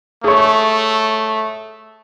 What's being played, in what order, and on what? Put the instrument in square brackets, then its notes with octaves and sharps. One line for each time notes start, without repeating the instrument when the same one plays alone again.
[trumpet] A3 [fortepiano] G#4 C#5